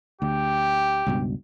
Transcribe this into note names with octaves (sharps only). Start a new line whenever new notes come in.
D2 G4
C#2 G2 B2